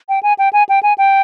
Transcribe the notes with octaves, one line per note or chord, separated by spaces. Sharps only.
G5
G#5
G5
G#5
G5
G#5
G5